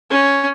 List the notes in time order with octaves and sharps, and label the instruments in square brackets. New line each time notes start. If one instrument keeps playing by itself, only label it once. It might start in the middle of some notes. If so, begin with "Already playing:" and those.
[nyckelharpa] C#4